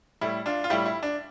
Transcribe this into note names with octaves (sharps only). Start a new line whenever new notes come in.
A2 G3 E4
D4 F4
F4
A2 G3 E4 G4
E4
D4